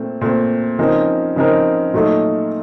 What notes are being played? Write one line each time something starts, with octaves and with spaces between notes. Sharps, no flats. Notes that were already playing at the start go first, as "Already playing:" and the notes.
Already playing: A#2 A3 C4
A#2 A3 C4
C#3 F3 C4 D#4 A#4
C#3 F3 C4 D#4 A#4
A#2 F#3 A3 D#4 A4